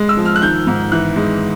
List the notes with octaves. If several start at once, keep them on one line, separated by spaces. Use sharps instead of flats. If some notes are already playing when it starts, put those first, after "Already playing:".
Already playing: G#3
E6
F3
F6
F#6
D#3 G6
G#2
E3 F#6
G#3